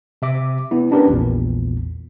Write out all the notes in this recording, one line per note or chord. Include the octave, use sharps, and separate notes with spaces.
C3 E5 D6
B3 E4
C#4 D4 G4 A#4 B4
A#1 E2 A#2